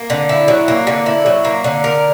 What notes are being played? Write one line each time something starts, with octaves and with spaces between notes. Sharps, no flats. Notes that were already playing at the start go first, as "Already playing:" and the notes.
Already playing: A#3
D3
E4
F#3
A#3
D3
E4
F#3
A#3
D3
A#4